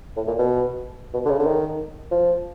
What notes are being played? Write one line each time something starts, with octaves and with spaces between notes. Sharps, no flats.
A2
A#2
B2
B2
D3
C#3
D3
D#3
F3